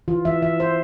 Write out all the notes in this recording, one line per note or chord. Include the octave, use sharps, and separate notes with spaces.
E3 F4
E3 E5
E3 E5
E3 C5